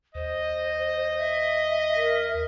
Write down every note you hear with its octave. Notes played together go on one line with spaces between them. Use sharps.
D#2 C5 D#5
E5
A#4